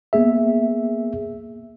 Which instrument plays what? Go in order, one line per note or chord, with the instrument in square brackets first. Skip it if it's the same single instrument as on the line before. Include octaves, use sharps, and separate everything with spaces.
[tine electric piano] A#3 B3 G#4 E5